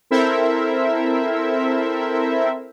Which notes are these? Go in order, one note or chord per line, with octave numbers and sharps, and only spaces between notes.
C4 E4 A4 A#4 C5 E5